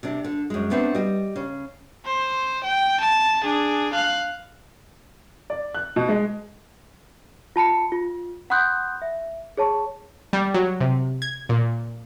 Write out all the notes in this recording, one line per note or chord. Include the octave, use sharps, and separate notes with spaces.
C3 D4
D3
F#2 G#3
A3 B3 C4 D4
G3 D#5
C#3
C5
G5
A5
D4 G#4
F5 F#6
D5
F#6
B2
G#3
F4 A5 B5 C#7
F4
F#5 B5 C6 D#6 F#6 G6
E5
G#4 C#5 A5 C#6
G3
F#3
C3
G#6
A#2